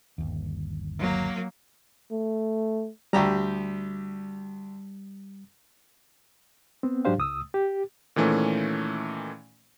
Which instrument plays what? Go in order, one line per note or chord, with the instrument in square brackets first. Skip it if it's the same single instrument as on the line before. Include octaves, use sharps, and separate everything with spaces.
[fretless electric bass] G1 D#2
[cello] F#3 A#3
[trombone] A3
[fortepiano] D2 G4 A#5 [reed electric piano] G3
[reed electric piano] B3 C4
G#2 F#3 D4 G4 C5 F5
C#2 D#6 E6
G4
[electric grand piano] A#2 D#3 E3 A3 C#4